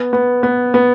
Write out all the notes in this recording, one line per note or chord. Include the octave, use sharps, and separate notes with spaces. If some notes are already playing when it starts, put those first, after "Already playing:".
Already playing: B3
B3
B3
B3